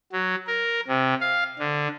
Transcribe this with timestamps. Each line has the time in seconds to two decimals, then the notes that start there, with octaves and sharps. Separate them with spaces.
0.12 F#3
0.47 A#4
0.88 C3
1.21 F5
1.59 D3